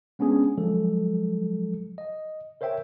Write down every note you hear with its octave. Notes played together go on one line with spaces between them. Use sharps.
G#3 B3 C#4 D4 G#4
F3 F#3 G#3 A4
D#5
A#4 C5 C#5 E5 G5